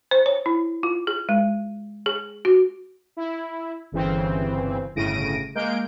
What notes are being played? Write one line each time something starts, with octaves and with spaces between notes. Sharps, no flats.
C5
C#5
E4
F4
G#4
G#3
G#4
F#4
E4
G1 C#3 E3 C4
G1 A2 C#3 A#6 D7 D#7
G#3 A#3 A#4 G6 D7